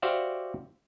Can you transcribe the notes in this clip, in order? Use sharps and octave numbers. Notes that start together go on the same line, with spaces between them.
F#4 G4 C5 D5 E5 F5